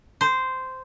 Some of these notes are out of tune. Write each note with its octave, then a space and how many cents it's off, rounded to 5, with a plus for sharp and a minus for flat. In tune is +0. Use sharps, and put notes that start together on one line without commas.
C5 -10